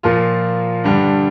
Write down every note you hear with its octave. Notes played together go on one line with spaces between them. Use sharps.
A#2 F3 A#3 F4
G2 D3 G3 D4